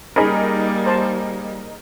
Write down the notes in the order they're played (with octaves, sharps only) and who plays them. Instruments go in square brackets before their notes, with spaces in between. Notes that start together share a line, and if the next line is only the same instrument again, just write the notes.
[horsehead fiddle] G3 A#3 [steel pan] C#4 B5 [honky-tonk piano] D#4 G#4 A#4
[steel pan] C5 A5 C6